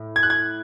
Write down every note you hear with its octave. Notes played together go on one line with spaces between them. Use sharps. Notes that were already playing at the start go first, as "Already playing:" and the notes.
Already playing: A2
G#6
F#6
G#6